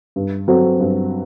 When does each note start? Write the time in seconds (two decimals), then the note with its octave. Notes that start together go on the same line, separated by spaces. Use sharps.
0.16 G2
0.48 F#3 C4 F#4 A4
0.80 G2